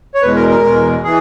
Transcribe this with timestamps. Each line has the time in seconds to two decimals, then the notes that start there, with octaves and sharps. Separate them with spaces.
0.15 C#5
0.22 E2 B2 G#3 B4
0.36 A#4
0.49 A#4
0.62 E2 B2 G#3
1.04 E3 G#4